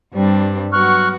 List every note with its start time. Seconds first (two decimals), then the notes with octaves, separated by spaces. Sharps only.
0.14 G2 G3 C4 D4
0.73 F#3 B3 F#4 C#6 F6 F#6